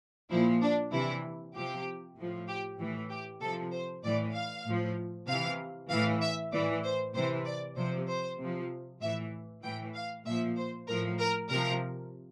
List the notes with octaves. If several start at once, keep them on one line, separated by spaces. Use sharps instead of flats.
A#2 F3 E4
D4
C3 E3 E4
C3 F3 G4
A2 F3
G4
A2 E3
G4
C3 F3 A4
C5
A2 E3 D5
F5
A2 F3
C3 E3 F5
A2 E3 F5
E5
A2 E3 D5
C5
C3 E3 C5
D5
C3 F3 C5
C5
C3 F3
A2 E3 E5
A2 E3 G5
F5
A#2 F3 E5
C5
A2 F3 A#4
A#4
C3 F3 A#4